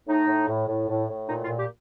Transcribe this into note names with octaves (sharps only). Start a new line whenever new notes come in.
A2 D#4
A2
A2
A2
A2
A2
A#2 D#4
F4
A#2
G4